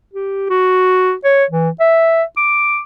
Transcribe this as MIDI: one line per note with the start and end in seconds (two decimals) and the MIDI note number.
0.13 0.46 67
0.50 1.13 66
1.24 1.44 73
1.50 1.69 52
1.80 2.23 76
2.37 2.81 86